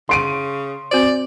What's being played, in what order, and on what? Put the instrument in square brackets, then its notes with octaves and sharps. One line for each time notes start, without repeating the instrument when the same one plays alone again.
[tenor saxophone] C#3 [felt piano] C6 D7 D#7
[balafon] C4 F#4 C5 [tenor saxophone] D5